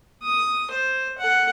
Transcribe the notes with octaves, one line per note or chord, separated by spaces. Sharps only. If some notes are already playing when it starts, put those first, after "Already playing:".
D#6
C5
A4 F#5